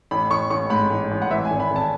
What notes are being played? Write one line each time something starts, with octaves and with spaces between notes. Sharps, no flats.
A1 B5
A1 C#6
A1 C#6
G#2 B5
A1
A1
F#5
E3 E5
G#5
G#1
B5
G#1 A5